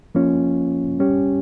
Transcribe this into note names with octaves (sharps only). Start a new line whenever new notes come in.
F3 A#3 C#4 F4
G3 C#4 G4